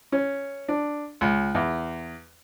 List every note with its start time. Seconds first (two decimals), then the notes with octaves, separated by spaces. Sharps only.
0.12 C#4
0.68 D4
1.21 C#2
1.55 E2